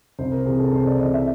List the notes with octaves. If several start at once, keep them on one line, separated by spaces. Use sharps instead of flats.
C2 C5
A#4
C3 E3 G#4
A4
C2 C5
D5
C3 E3 D#5
E5